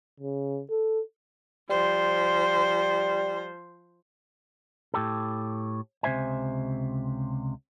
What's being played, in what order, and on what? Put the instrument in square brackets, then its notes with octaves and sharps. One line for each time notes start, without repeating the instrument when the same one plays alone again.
[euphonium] C#3
A4
[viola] F3 C5 [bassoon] G3
[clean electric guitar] A2 G4 A4
C#2 C3 C4 C5 E5 G#5